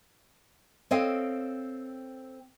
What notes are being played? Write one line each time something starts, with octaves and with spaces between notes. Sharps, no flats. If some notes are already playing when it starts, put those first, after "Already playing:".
C4 A4 C#5 D#5 F5 G5